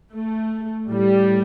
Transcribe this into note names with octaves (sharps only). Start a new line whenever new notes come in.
A3
A2 G3